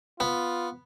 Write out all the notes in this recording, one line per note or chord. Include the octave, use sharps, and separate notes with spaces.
B3 F4